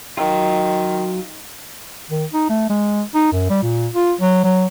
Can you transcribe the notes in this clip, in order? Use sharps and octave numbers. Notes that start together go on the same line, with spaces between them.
D#3 F#3 F4
D#3
D#4
A3
G#3
D#4
F#2
G3
A#2
F4
F#3
F#3